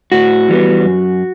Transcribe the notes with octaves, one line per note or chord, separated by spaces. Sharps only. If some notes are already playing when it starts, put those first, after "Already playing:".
A2 F#4
E3 G3 B3
F#2